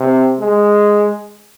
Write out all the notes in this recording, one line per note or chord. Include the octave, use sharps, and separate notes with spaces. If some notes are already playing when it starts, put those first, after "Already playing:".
Already playing: C3
G#3